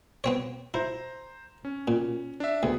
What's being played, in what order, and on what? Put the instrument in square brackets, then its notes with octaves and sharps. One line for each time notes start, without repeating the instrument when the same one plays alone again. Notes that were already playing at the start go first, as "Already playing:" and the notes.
[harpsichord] B3 C4 C#5
[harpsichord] E4 [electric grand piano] C5 A#5
[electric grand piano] C#4
[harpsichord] A#2
[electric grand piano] D4 E5
[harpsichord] D2 [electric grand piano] B3 G#4